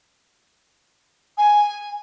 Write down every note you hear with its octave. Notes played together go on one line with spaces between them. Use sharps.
G#5